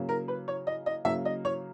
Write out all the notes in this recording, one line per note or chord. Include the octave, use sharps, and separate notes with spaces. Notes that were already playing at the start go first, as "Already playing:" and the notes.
Already playing: C#3 F#3 A#3
A#4
B4
C#5
D#5
D#5
C#3 F#3 A#3 E5
D#5
C#5